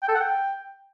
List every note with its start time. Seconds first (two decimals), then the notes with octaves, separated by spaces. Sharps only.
0.02 G5
0.09 A4
0.15 F#5
0.21 G5